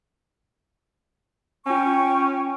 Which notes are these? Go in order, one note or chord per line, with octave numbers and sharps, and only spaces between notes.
C#4 F4 G5 G#5 C#6